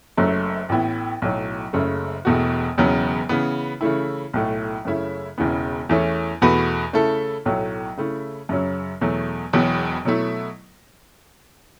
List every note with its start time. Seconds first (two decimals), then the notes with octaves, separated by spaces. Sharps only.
0.17 F#1 F#2 F#3 A3
0.69 A1 A2 E3 B3 E4
1.22 B1 A2 F#3
1.73 F#1 F#2 C#3 A3
2.25 E1 E2 B2 A3 F#4
2.77 E1 E2 C#3 F#3 B3
3.29 C#3 E3 B3
3.81 C#3 E3 A3 E4
4.34 B1 A2 A3
4.85 F#2 C#3 A3 C#4 E4
5.38 E1 E2 C#3 E3 B3
5.89 E2 E3 A3 C#4 E4
6.42 E2 B2 A3 F#4 B4
6.93 C#3 A3 E4 A4
7.45 B1 A2 F#3 A3
7.97 C#3 A3 E4
8.49 F#2 C#3 F#3 C#4
9.01 E2 B2 F#3 A3
9.53 E1 E2 B2 F#3 B3
10.05 B2 F#3 A3 E4